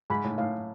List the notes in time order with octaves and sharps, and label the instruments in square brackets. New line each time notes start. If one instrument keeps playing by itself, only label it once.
[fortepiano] G#2 [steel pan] B5
[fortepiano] A2
[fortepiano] A2 [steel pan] F5